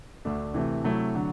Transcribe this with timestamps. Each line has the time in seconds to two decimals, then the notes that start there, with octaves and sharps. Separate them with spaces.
0.25 D2 D3 A3 D4
0.54 C3 E3 A3
0.84 C3 F#3 A3 E4
1.15 D3 F#3